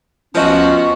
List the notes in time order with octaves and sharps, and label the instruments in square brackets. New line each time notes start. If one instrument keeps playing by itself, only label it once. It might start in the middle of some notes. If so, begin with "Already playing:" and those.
[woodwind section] D2 C#4 [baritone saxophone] F3 [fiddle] B3 F#4 [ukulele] C5 D#5